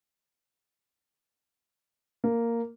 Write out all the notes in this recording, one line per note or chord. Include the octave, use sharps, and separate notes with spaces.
A#3